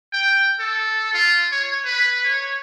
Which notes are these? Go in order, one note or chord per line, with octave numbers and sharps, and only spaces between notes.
G5
A4
F4
C#5
B4
C#5